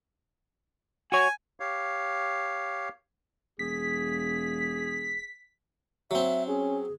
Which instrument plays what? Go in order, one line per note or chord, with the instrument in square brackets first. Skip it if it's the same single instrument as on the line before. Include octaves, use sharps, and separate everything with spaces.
[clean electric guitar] F#4 C#5 [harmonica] G#5
[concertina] G4 C#5 F5
[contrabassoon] E1 [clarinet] G#4 [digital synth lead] B6
[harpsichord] F#3 C4 [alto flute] E5
[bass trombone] C#4 [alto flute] G#4